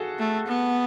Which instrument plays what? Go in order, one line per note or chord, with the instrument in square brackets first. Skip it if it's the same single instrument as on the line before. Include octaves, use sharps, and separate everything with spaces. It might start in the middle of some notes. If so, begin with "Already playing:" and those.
Already playing: [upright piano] F#4 G#4 A4
[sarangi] A3
B3